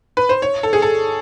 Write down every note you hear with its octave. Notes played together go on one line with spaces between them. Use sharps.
B4
C5
C#5
A4
G#4
A4